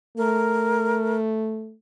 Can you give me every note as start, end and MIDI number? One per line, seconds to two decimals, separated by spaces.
0.17 1.74 57
0.17 1.17 70